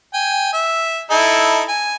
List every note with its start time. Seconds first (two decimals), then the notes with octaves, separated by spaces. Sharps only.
0.14 G5 G#5
0.53 E5
1.11 D#4 E4 A4
1.68 G#5